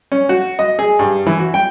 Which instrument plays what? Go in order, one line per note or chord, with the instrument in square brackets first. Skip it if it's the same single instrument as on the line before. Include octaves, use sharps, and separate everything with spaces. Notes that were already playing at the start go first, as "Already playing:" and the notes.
[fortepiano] C#4
F#4
D#5
G#4
G2
E3
F#4
G5